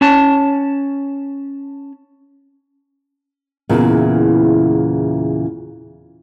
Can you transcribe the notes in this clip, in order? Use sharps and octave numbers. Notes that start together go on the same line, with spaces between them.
C#4 A5
E2 A#2 C#3 E3